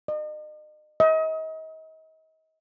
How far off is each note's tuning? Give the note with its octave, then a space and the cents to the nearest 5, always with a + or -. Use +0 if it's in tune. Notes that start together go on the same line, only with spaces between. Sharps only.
D#5 -40
D#5 +35